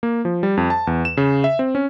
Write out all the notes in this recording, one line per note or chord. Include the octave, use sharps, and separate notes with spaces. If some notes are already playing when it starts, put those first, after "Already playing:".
A#3
F3
G3
F2
A5
E2
E7
C#3
E5
C4
C#4